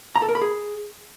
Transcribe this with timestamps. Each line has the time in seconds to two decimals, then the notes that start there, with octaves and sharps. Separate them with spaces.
0.16 A#5
0.22 A4
0.29 A#4
0.35 B5
0.42 G#4